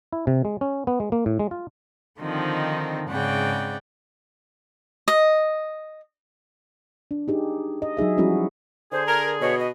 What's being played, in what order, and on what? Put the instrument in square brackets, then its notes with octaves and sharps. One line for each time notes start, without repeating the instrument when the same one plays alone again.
[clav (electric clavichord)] E4
C3
G#3
C#4
B3
G#3
A#3
A2
G#3
F4
[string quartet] D3 D#3 F3 C4 D#4
G#2 C#3 C4 D5 F#5 G5
[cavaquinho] D#5
[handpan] D4
D#4 G4 G#4
D#5
F#3 D#4 G#4 E5
F3 G3 C#4 E4 F#4 G#4
[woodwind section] D3 G#4 [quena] C5
[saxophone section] A#4 [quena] G#6
[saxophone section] B2 [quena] C#5
[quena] D#5